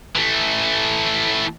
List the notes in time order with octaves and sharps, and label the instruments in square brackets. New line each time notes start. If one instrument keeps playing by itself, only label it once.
[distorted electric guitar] E3 A3